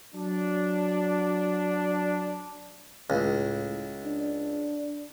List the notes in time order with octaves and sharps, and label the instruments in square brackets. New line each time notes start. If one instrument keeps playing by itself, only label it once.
[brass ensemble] F#3 D4
[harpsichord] C#2 [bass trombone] A2
[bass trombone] D4